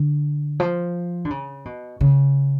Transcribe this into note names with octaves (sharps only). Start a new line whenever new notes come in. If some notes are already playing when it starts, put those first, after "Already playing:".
Already playing: D3
F3
D3
C#3
B2
C#3